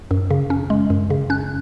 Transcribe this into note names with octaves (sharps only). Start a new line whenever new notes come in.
F#2
C#3
C#4
G#3
F#2
C#3
C#4 F#6